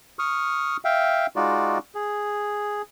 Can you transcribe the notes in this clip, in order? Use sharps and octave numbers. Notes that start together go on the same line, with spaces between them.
C#6 D#6 F6
E5 F5 G5
G#3 D#4 F4 F#4 D5
G#4